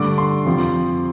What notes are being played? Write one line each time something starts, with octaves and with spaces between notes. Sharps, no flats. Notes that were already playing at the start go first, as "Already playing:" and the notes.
Already playing: G2 D3 A3 D6
C6
F2 C3 F3